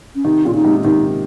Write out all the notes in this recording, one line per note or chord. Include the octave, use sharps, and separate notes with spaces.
C#4
C3 D#3 D#4
A#2 C#3 F4
D#4
G#2 C3
C3 D#3 D#4